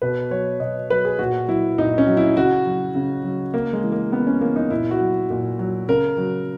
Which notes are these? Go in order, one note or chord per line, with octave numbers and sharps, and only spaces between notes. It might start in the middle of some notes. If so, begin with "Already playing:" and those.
B2 B4
F#3 C#5
B2 D#5
F#3 B4
G#4
A#2 F#4
F#3 E4
A#2 D#4
C#4
F#3
E4
C#3 F#4
F#3
C#3
F#3
C#3 A#3
G#3
E3
A#3
C#3 B3
C#4
E3 A#3
D#4
A#2 E4
F#4
F#3
A#2
F#3
C#3 A#4
F#3